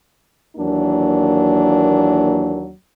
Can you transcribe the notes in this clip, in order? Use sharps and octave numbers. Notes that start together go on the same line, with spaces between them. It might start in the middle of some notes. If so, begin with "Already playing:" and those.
D#2 E3 F#3 A#3 D4